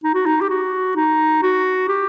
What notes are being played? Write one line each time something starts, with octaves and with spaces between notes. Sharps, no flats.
D#4
F#4
D#4
G4
F#4
D#4
F#4
G4